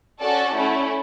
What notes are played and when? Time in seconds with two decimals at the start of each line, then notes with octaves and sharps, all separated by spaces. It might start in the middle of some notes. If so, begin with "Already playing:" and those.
0.20 C#4 F#4 A4 D5
0.55 A3 C#4 E4